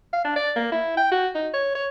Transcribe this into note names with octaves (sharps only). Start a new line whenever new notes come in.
F5
D4
D5
A#3
E4
G5
F#4
D#4
C#5
C#5